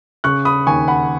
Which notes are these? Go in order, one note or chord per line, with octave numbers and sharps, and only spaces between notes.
C#3 C#6 F#6
B5 D#6
D#2 G#5 C#6
F#5 B5